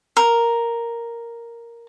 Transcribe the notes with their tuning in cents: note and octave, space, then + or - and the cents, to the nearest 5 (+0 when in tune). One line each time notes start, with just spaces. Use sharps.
A#4 +0